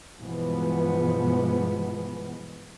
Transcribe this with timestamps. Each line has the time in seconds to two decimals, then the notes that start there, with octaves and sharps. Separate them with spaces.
0.19 G2 B2 E3 F3 G#3 B3